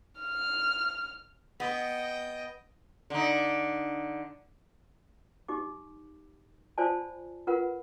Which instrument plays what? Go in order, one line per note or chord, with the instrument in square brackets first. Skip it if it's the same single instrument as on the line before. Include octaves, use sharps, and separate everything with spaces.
[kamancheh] F6
[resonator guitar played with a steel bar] B3 [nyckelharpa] D#5 G5
[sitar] D3 D#4
[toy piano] D#4 G4 D6
F4 C5 D5 G#5 A5
F4 A#4 B4 F#5